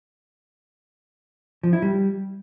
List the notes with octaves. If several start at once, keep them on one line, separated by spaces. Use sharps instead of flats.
F3
E4
G3